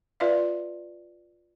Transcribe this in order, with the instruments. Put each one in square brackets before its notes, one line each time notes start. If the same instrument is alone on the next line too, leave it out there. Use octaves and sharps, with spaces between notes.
[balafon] F4 B4 D5 E5 F5